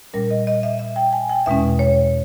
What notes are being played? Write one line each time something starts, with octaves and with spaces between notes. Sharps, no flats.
A#2 G3 C#4 A#4
D#5
D#5
E5
E5
G5
G#5
G5
E2 B2 G#3 C#4 E5
C#5